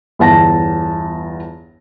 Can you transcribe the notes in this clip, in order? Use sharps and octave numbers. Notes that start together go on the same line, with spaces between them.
G1 E2 A5 A#6